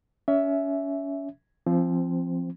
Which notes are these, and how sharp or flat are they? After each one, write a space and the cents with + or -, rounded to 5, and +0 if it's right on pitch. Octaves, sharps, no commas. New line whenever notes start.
C#4 +30 E5 +0
F3 -20 C4 +5